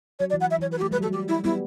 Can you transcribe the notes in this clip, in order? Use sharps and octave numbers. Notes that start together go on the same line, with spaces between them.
F#3 C#5
D5
E3
F#5
E5
E3 C#5
B4
F#4
A3 G4
G3 B4
F#3
A4
G3
G4
E4
G3 B3 E4